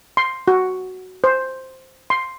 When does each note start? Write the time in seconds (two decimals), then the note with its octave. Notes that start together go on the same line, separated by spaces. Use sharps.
0.17 C6
0.48 F#4
1.24 C5
2.10 C6